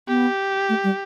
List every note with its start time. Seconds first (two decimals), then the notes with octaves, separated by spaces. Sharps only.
0.08 B3 G4
0.69 A3
0.84 G3